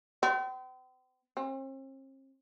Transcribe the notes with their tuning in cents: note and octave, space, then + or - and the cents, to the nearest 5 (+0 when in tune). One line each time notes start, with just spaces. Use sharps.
C4 -40
C4 +45